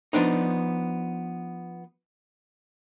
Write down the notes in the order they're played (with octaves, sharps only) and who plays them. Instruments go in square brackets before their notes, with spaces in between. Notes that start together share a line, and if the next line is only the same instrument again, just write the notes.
[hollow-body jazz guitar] F3 B3 D4 D#4